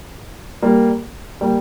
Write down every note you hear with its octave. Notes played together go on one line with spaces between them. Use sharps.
G3 A#3
G3 A#3